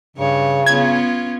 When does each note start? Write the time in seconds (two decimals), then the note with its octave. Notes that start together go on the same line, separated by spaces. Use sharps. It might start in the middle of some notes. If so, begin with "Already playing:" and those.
0.17 G2 C#3 C#5
0.66 B3 C#4 F4 G#6